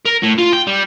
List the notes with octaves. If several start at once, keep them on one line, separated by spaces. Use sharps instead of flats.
A#4
A2
F4
G5
G3